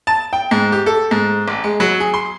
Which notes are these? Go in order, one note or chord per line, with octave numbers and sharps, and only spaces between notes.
A5
G5
G#2
G4
A4
G#2
A1
G#3
F#3
G#4
C6